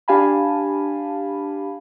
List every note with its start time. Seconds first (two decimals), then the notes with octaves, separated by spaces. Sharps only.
0.08 D4 G4 F5 G#5 A5 B5